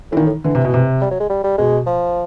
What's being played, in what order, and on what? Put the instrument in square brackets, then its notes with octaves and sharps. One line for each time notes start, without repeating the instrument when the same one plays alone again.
[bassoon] A2 [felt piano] E3
[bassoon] A#2 [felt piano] D#3
[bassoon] A2
[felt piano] D3 [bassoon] E3
[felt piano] C3
B2
C3
[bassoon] G3
F#3
G#3
G3
G3
[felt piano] B2 [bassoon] G#3
[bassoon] F3